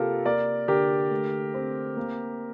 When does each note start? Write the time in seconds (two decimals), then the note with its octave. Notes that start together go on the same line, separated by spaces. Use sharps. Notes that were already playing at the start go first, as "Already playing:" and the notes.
Already playing: C3 A#3 F4 G4 A4 A#4
0.26 A#3 A#4 D5
0.68 D3 G4 A#4
1.11 A3
1.54 C4
1.97 A#3